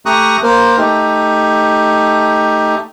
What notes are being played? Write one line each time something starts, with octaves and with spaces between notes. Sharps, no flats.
A3 G4 A#5 C#6 D#6 F#6
A#3 A#4 C5
A3 D#4 G4